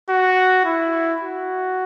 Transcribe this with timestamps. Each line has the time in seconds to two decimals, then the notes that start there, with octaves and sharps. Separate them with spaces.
0.10 F#4
0.65 E4
1.22 F#4